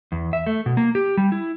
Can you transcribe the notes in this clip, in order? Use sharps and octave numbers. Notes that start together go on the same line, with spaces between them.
E2
E5
A3
B2
A#3
G4
G3
E4